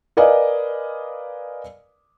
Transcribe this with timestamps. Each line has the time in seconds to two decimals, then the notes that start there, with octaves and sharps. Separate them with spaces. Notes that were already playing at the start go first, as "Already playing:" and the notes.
0.17 A#4 B4 D5 D#5 F5 G#5